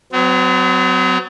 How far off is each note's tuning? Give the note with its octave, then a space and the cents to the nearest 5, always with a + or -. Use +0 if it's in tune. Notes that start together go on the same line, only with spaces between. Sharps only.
F#3 +0 C4 -45